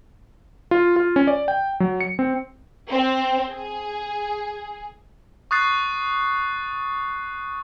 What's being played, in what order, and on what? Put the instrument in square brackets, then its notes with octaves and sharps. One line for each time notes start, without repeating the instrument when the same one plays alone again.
[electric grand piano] F4
F4
C#4
D5
G5
F#3
C#7
C4
[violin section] C4
G#4
[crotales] C#6 D#6 F#6 A6 C7